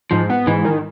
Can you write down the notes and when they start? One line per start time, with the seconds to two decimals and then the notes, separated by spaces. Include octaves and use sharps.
0.11 G#2 F3
0.30 B3
0.47 G#2 E3
0.65 D#3